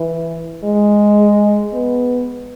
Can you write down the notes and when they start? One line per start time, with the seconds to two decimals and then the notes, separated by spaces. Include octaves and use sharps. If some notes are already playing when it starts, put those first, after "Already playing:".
Already playing: E3
0.64 G#3
1.73 B3